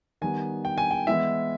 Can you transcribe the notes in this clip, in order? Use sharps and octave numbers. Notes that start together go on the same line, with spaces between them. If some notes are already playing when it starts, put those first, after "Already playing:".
D#3 G3 B3 G#5
G5
G#5
G5
E3 G#3 B3 E4 E5